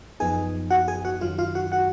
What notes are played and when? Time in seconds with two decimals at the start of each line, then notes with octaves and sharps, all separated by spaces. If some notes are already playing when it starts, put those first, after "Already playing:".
0.20 F#2 F3 B3 D#4 G#4 G#5
0.70 F#4 F#5
0.88 G#4 G#5
1.05 F#4 F#5
1.21 F#2 D#3 F#3 F4 F5
1.38 F4 F5
1.55 F#4 F#5
1.72 F#4 F#5